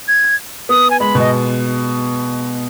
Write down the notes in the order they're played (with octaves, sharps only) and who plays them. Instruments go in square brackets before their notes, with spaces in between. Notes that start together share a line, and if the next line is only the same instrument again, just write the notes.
[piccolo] G#6
[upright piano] B3 [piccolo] D#6
[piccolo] G#5
[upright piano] G#3 [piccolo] B5
[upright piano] B2
[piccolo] D#5